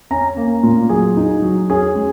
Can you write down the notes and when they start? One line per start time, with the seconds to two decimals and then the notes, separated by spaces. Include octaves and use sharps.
0.11 C#4 A#5
0.37 A#3
0.63 A#2
0.89 F#3 G#4
1.17 D#4
1.42 F#3
1.69 C#4 G#4
1.96 G#3